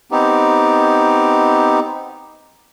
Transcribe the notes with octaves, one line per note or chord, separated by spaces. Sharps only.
B3 C4 D#4 G4